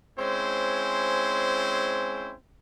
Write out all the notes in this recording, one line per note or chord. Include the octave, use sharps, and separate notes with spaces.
G#3 C4 C#4 E4 C5